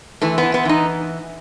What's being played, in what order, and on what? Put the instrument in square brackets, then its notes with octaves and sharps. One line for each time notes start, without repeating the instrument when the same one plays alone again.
[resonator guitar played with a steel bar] E3 A3
E3 B3
B3
E3 D#4